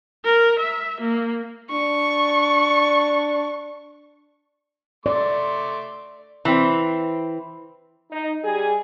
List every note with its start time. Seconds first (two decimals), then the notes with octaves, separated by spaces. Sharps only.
0.25 A#4
0.60 E5
1.01 A#3
1.72 D4 C#6
5.06 A3 D5 C6 D6
6.45 E3 C4
8.11 D#4
8.42 G3 G4 G#4